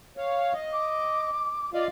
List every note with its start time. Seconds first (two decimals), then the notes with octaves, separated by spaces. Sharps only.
0.17 C#5 F5
0.53 D#5
0.73 D6
1.74 F4 D5 D#5 F5